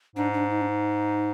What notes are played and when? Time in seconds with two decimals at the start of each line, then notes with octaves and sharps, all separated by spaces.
0.16 G#2 D4
0.34 D4
0.50 D#4
0.61 D4
0.68 D#4